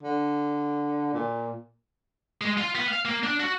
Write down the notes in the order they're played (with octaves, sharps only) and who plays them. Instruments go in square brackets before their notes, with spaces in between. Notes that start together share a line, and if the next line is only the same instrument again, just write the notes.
[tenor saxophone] D3
A#2
[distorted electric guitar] G#3
F4
B3
F5
A#3
D4
F#4